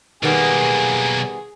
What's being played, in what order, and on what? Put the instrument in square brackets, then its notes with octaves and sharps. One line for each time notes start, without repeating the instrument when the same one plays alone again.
[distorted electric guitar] B1 A#3 [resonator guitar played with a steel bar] D#3 G3 B3 [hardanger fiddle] G#4